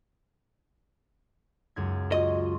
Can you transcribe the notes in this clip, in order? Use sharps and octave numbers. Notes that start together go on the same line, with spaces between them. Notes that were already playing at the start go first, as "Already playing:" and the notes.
C#2 F#2 G#6
F4 F#4 D#5